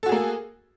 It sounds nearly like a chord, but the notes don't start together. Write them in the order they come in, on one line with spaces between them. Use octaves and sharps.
A4 F#4 G#4 A#3